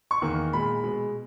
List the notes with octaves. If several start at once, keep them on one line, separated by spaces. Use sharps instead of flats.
C#6
E2 D#3 A#3
A#2 G#3 B5
B2 G#3